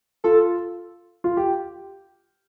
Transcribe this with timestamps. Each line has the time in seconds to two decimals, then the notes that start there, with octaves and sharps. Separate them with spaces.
0.24 F4 A4
1.24 F4
1.37 G4